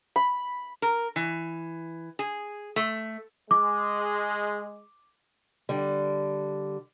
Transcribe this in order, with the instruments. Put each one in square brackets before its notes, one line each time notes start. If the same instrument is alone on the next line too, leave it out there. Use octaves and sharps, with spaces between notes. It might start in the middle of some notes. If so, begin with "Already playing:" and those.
[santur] B5
[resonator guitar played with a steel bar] A#4
E3
G#4
A3
[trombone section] G#3 [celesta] D6
[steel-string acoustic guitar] D3 G3